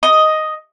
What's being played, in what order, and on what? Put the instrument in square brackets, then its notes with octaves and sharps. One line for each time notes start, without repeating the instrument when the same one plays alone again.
[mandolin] D#5